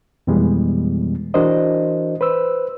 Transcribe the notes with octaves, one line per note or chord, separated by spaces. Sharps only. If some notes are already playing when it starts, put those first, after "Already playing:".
F2 B2 E3 G3 G#3 B3
E3 D4 F#4 A#4 C5 D#5
B4 C5 E6